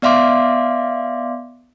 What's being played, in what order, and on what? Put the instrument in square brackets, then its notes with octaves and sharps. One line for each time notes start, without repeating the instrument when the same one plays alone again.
[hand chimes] B3 D5 E5 F5 C6 D6